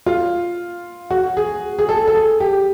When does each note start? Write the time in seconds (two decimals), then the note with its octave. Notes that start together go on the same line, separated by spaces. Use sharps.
0.06 F4
1.11 F#4
1.37 G#4
1.79 G#4
1.89 A4
2.07 A4
2.14 G#4
2.40 G4